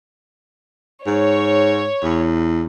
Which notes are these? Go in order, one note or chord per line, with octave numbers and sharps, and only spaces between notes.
G#2 C#5
E2